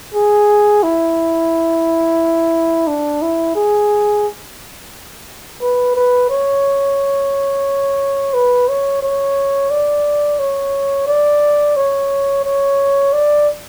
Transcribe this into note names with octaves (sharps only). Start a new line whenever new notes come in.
G#4
E4
D4
E4
G#4
B4
B4
C#5
B4
C#5
C#5
D5
C#5
D5
C#5
C#5
D5